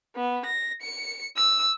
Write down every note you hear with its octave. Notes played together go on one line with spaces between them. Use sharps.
B3
A#6
C#7
E6